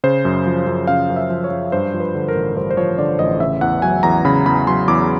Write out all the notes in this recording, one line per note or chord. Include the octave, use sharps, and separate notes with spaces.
C#3 C5
F#2
F3
F#2
C#3 F5
F#2
E5
F3
C#5
F#2
G2 C5
F3
B4
D3
A#4
A1
G2 C5
C5
F3 C#5
D3 D5
A1 D#5
C#3 E5
E2 F#5
F#3 G#5
E2 A#5
C#3 B5
E2 B5
F#3 C6
E2 D6